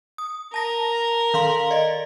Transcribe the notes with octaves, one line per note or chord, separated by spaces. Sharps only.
D#6
A#4 A5 A#6
D#3 F5 C6
D5 D#5